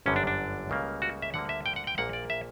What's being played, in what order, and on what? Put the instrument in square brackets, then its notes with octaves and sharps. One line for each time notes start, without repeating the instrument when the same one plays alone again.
[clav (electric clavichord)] G1 F#2 D3 G3 C#4
D4
D4
C#2 C#3 G3 A#3
F#4
E5
D2 D3 G3 A#3 F#5
E5
G5
F#5
G5
A#1 A#2 A#3 F#5
D5
E5